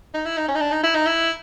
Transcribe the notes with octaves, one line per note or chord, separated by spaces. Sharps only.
D#4
E4
D#4
C#4
D#4
D4
D#4
E4
D#4
E4